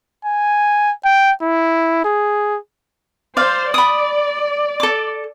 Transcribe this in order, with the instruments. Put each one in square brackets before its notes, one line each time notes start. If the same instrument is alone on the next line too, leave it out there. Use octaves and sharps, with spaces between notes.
[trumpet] G#5
G5
E4
G#4
[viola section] C5 [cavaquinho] D5 F5
[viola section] D5 [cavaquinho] B5 D#6
[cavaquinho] A4 D6